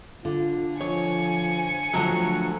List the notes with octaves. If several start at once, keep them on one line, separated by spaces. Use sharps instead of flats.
D3 F4
F3 C#5 G#5 C#7
A2 D3 F3 F#3 A3 A#4